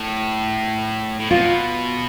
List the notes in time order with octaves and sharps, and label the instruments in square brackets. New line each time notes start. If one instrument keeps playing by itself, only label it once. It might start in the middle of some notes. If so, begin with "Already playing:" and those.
Already playing: [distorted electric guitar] A2
A2
[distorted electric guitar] B2 [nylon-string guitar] F4